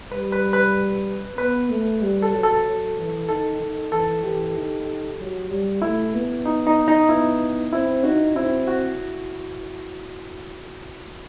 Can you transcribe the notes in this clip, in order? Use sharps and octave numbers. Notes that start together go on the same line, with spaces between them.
G3 B4
B4
B4
B3 B4
A3
G3
A4
F#3
A4
F#3
E3
D#3 A4
D#3
E3 A4
E3 G4
D#3
F#3
G3
A3 E4
B3
D#4
D#4
D#4
B3 E4
C4 E4
D#4 F#4
C4 E4
F#4